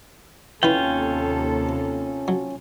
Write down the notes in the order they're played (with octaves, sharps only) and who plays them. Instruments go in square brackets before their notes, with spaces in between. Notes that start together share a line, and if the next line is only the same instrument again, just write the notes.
[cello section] D#2 C3 A4 [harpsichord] E3 B4 [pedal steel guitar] C#4 F4 G5
[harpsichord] F#3